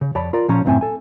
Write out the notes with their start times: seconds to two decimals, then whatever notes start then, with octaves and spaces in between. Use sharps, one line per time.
0.01 C#3
0.15 F2 C#5 D5 A5 B5
0.33 F4 A#4 D5
0.49 A#2 F3 C#4 C#5 A#5
0.65 C#2 F#2 A2 C4 E5 G#5
0.81 A4 G#5